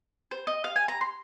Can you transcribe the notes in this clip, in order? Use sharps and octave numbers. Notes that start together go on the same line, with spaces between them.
C5
D#5
F5
G#5
A#5
C6